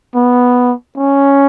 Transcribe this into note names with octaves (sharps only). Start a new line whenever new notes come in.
B3
C#4